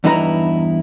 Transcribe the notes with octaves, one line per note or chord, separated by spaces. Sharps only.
E2 G2 D#4 E4 B4 A#5